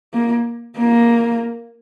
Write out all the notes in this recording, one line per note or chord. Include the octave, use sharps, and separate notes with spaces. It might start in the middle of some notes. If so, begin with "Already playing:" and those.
A#3
A#3